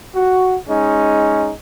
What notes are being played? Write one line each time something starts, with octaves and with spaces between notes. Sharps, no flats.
F#4
G#3 C#4 D#4